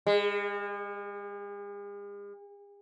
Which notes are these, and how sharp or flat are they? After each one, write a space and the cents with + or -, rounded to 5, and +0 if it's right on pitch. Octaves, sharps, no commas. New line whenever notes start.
G#3 -45